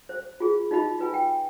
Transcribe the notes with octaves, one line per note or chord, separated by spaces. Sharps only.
C5
F4 G#4
D#4 F4 D#5 B5
F4 B4 G#5
G5